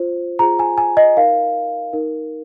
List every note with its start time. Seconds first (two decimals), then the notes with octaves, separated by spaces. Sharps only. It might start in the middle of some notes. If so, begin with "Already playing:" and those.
Already playing: F4 C5
0.39 F4 G#4 C5 A#5
0.59 G#5
0.78 G#5
0.97 D#5
1.17 D#4 A#4 F5
1.93 D#4 A#4